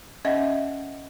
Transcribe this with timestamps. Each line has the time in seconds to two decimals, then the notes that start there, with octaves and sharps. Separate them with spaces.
0.25 C#4 D#5 E5 F#5